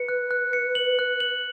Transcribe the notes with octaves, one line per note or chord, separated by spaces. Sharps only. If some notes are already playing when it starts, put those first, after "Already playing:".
Already playing: B4 C#7
F#6
F#6
C#7
F#7
F#6
F#7